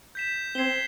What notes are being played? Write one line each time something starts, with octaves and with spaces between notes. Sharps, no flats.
G6 B6 E7
C4 G#6 C7 E7 G7